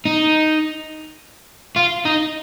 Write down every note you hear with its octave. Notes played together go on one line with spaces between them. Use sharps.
D#4
F4
D#4